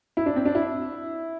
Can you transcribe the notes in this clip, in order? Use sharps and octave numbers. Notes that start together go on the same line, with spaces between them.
E4
D4
C4
D4
E4